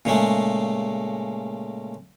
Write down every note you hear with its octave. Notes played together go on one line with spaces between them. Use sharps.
A#2 C#3 G#3 A3